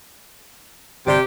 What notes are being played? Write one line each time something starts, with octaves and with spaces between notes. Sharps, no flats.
G1 C3 G4 D5